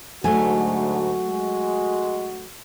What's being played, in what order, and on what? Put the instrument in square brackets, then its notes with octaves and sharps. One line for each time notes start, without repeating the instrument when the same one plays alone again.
[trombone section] D2 G#2 [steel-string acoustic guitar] F#3 A3 [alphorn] F#4 [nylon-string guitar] G#5
[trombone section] G#3